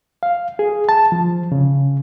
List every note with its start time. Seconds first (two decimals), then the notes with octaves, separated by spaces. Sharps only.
0.23 F5
0.59 G#4
0.89 A5
1.12 F3
1.52 C#3